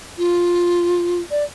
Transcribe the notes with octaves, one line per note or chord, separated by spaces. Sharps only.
F4
D5